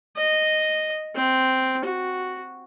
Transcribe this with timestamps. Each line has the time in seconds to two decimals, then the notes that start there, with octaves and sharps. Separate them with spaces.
0.16 D#5
1.16 C4
1.85 F#4